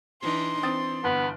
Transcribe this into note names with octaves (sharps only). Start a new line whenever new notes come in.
E3 D4 D#4 C6
E3 C4 D#6 A6
G1 B3